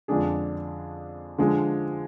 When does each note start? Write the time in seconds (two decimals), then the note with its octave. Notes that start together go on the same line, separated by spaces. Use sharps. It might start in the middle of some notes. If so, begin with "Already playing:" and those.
0.08 F2 D3 G#3 D4 G#4
1.38 D3 F3 G#3